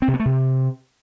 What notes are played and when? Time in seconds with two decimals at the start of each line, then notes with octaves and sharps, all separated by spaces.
0.02 C4
0.08 C3
0.14 B3
0.20 A3
0.25 C3